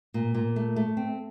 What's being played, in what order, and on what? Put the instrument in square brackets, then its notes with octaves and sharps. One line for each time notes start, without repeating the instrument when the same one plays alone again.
[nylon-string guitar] A#2
A#2
A3
A3
C4